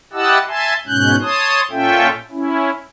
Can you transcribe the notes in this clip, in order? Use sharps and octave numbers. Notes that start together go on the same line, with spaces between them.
E4 G4 D#5 F#5 A5 E6
E5 G#5 A5 C6
G#2 B2 C#4 F#6 G6
C#5 A5 C6 D#6
A#2 C#4 F4 A4 E5 G5
C#4 E4